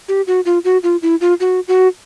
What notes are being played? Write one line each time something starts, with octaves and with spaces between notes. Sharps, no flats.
G4
F#4
F4
F#4
F4
E4
F4
F#4
F#4